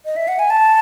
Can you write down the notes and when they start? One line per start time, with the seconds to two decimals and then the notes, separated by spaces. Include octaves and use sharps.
0.05 D#5
0.16 E5
0.28 F#5
0.39 G#5
0.50 A5